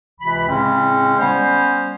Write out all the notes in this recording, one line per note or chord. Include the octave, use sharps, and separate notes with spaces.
C#2 C3 E3 B5
A2 C#3 G#3 C4 C#4
G3 B3 C#4 C5